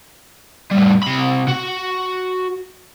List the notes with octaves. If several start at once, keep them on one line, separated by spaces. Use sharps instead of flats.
A2 G3
C3 B5
F#4